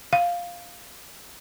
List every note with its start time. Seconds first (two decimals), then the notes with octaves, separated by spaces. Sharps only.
0.13 F5